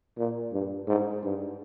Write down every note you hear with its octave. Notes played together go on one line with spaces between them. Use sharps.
A#2
G2
G#2
G2